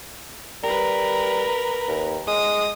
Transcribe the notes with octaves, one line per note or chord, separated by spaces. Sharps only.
G3 A#4 B4
D#2
G#3 D#6